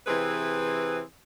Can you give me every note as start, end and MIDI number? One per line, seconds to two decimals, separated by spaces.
0.07 1.01 48
0.07 1.01 52
0.07 1.01 60
0.07 1.01 68
0.07 1.01 71